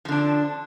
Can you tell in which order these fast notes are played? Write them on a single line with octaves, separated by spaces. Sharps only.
F3 D3 D4